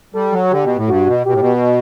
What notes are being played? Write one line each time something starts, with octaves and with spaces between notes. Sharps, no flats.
G3 A4
F#3
D3 G4
B2
A2
G2 F#4
B2
B2 G4
A2
B2